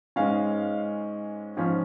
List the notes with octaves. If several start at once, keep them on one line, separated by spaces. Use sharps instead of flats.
G#2 G#3 C#4 F5
G#2 F3 C#4